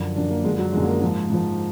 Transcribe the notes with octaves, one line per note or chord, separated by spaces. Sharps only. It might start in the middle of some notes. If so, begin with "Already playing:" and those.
Already playing: F#2 D3 F3
F#2 D3 F3 D4
A#3
F#2 D3 F3 G#3
F#3
F#2 D3 F3 G#3
A#3
G#3
G#2 F3
G#2 F3